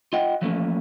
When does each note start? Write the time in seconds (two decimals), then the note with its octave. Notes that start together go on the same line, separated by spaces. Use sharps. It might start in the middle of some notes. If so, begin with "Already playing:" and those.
0.13 F4 D#5 F#5 G5
0.42 E3 F3 A3 A#3 C#4